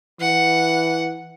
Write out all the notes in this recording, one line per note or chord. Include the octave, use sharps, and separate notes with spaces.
E3 F#5